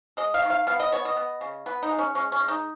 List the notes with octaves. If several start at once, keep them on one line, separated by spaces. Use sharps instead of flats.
G#3 D#5
F5
D#3
F5
B3 F5
D#5
B3 C#5
D#5
B3
C#3
B3 B4
D#4
G#3
C#4
G#3 C#4
C#4
G#3
D#4